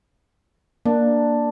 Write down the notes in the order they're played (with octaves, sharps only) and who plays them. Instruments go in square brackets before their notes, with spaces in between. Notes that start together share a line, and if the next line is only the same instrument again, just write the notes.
[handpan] A#3 [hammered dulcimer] D4